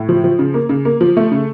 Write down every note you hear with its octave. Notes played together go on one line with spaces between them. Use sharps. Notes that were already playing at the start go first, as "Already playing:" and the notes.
Already playing: A2
F3
F3
C#3
A#3
C#3
A#3
F3
A3
C#3